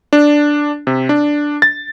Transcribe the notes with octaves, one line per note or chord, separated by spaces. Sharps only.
D4
C3
D4
A6